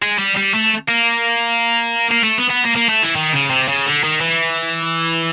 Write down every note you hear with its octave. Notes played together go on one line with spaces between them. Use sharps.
G#3
G3
G3
A3
A#3
A#3
A3
B3
B3
A#3
A#3
A3
E3
D#3
C#3
C3
C#3
D3
D#3
E3